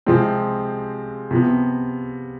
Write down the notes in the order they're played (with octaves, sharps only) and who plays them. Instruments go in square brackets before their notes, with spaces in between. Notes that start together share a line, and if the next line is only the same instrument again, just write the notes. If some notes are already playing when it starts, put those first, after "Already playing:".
[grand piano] C3 F3 G#3 C4
C3 F3 B3